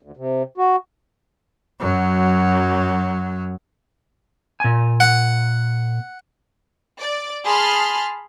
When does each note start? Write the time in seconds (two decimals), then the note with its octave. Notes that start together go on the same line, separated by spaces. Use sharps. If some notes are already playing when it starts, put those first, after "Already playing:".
0.03 D2
0.17 C3
0.58 F#4
1.80 F#2 F#3
4.60 A#2 G#5
5.00 F#5
6.99 D5
7.45 G#4 A5 B5 C6 F6